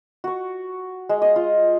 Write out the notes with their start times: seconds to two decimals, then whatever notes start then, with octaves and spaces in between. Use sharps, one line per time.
0.24 F#4 C#6
1.09 G#3
1.22 D#5 F5
1.36 F4